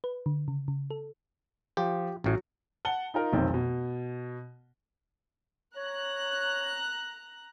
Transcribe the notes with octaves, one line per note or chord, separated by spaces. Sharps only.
B4
D3
C#3
C#3
A4
F3 G4
A1 A2 F#3 F#4
F#5 A5 G7
D#4 F4 A#4
F1 B1 D#3 C4
B2
C#5 A#5 F#6